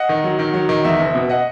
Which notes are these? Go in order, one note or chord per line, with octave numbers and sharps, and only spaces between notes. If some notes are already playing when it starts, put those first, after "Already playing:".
Already playing: D#5 F#5
D#3
F#3
D#3
F#3
D#3
E2 E5
F#1
B2
D#5 F#5